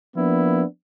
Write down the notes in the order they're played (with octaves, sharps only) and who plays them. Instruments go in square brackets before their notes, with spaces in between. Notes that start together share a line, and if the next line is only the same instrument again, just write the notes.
[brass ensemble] F3 A#3 B3 D4 E4